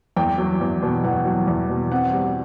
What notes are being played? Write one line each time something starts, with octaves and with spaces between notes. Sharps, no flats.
E2 G5
F#3
E2
B2
E2 F#5
F#3
E2
B2
C4 F#5
G3